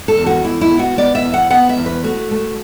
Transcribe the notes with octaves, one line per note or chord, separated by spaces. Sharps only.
A4
E2
F#4
E2 E4
E4
B3
F#4
B3 D5
E5
E2
F#5
B3 F#5
E5
E2
B4
A3 F#4
A3